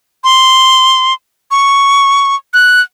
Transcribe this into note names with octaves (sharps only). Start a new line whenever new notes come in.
C6
C#6
F#6